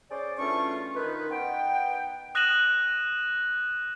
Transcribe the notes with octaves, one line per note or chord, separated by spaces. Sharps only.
C#4 G#4 C5 D5
E2 A3 C#4 D4 F4 C#6
D#3 F4 B4
B3 D#4 F#5 G5
D#6 F#6 A#6 D#7 E7 F#7